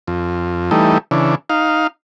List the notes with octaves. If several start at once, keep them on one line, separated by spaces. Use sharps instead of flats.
F2
E3 G3 A3 D#4
C#3 E3 D4
D#4 F5